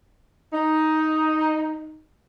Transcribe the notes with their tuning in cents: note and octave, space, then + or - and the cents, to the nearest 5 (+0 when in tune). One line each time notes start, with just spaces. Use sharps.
D#4 +5